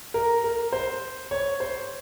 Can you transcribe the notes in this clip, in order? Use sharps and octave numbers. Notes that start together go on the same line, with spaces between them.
A#4
A#4
C5
C#5
C5